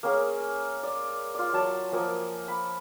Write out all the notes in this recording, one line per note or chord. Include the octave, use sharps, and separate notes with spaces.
A#3 C#4 G#4
D5
F4 D5
F#3 D5 A5
F3 A#3 G#5 D#6
B5